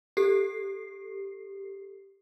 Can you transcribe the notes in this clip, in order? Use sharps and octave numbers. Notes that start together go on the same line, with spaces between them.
G4 A4 C7